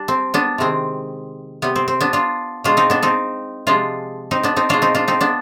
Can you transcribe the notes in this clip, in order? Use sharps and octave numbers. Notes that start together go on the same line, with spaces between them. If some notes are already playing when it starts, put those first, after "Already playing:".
Already playing: G3 D4
C4
B3 D4
C3 D#3 G#3 C4
C3 G3 B3
C4
C4
B3 D4
D4 F4
B2 G#3 D4 F4
C4 D#4
B3 D4
C4 D#4
C3 F3 G#3 D4 F4
C4 D#4
B3 D4
C4 D#4
B2 G#3 D4 F4
C4 D#4
D4 F4
C4 D#4
B3 D4